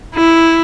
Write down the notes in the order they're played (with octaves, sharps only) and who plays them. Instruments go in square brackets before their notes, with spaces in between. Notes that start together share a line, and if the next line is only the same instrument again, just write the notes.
[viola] E4